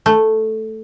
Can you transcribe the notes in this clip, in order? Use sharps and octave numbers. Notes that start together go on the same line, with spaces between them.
A3